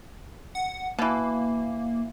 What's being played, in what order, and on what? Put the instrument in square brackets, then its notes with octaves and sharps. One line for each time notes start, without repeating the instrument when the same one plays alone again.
[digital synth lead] F#5
[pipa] B2 E3 [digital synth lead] A#3